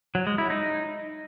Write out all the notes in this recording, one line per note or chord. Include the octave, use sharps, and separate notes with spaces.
F#3
G#3
E4
D#4